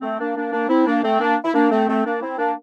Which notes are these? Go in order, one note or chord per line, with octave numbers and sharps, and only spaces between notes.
A3 C4
A#3 D4
A#3 D4
A#3 D4
C4 E4
A#3 D4
A3 C4
A#3 D4
E4
A#3 D4
A3 C4
A3 C4
A#3 D4
C4 E4
A#3 D4